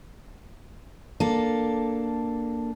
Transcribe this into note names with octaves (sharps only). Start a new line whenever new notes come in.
A#3 D4 A4